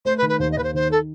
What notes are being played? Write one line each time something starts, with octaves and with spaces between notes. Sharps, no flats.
A3 C5
B4
D#3
B4
D#2 C5
D#5
D#2 B4
C5
D#3 C5
A4